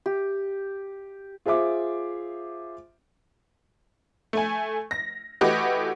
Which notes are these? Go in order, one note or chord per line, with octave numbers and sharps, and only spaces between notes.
G4
F4 G#4 C5 E5 D6
A3 G#5
A#6
E3 A3 F#4 G4 B4 D#5